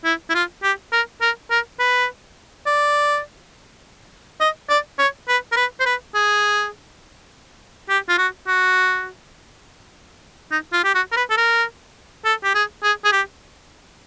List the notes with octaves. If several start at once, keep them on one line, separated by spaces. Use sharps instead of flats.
E4
E4
F4
G4
A#4
A#4
A#4
B4
D5
D#5
D5
C#5
B4
A#4
B4
C5
B4
G#4
G4
F4
F#4
F#4
D#4
F4
G4
F#4
A#4
B4
A4
A#4
A4
G4
G#4
G#4
G#4
G4